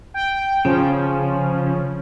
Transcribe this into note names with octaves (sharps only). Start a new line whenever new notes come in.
G5
C#3 F3 C#4